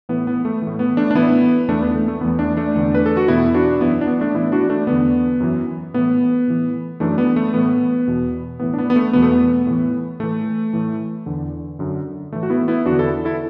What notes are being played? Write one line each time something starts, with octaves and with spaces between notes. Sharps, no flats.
A2 E3 B3
B3
A3
A2 E3
B3
A3 D4
D4
A2 E3 B3 E4
E2 E3 A3 D4
B3
A3
A3
E2 E3 B3
A3 D4
A3 D4
E2 D3
B4
A4
F#4
E2 B2 B3 E4
D4 F#4
F#2 E3 B3 E4
D4
B3
A3 D4
A2 E3 B3 E4
D4 F#4
A3 D4
E2 D3 B3
F#2 E3
A2 E3 B3
A2 E3
F#2 E3 A3 D4
B3
A3
A2 E3 B3
E2 B2
A2 E3 B3
D4
B3
B3
A3
E2 B2 B3
A3
B3
A2 E3
A2 E3 A3
A2 E3
E2 D3
F#2 D3
A2 E3 A3
F#4
B3 E4
B3 E4
E2 D3 D4 F#4
E4 A4
E4 A4